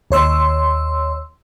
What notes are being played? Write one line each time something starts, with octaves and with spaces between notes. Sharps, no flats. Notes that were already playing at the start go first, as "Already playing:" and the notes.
D#2 C#5 C6 E6